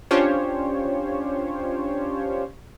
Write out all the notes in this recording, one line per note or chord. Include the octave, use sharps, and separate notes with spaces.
C#4 D4 F4 G4 C5 C#5